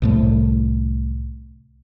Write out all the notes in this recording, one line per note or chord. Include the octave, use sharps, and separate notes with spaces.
C2 A2 A3